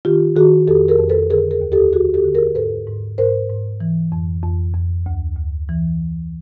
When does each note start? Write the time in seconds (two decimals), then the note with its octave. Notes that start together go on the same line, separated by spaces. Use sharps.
0.05 D#3 F4 G4
0.36 D#3 F#4 G#4
0.68 F2 G4 A4
0.88 G#4 A#4
0.99 F2
1.09 A4 B4
1.30 D3 G#4 A#4
1.51 G#4 A#4
1.61 D#2
1.72 G4 A4
1.93 D3 F#4 G#4
2.14 G4 A4
2.24 D3
2.35 G#4 A#4
2.55 G#2 A4 B4
2.87 G#2
3.18 G#2 A#4 C5
3.50 G#2
3.81 E3
4.12 F2
4.43 F2
4.74 F2
5.06 D2
5.37 D2
5.69 E3